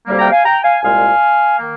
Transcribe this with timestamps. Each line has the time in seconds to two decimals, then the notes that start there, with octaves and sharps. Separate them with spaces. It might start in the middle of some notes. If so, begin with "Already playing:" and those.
0.06 D2 C3 G3 A#3
0.19 G5 A#5
0.32 F5 G#5
0.44 G5 A#5
0.64 F5 G#5
0.82 C2 A#2 G#3 F5 G#5
1.59 D#3 A#3